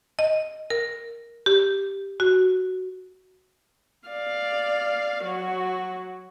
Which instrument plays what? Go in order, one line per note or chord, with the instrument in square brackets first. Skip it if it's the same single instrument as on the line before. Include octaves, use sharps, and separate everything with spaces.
[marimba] D#5
A#4
G4
F#4
[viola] D5 F5
F#3 F#4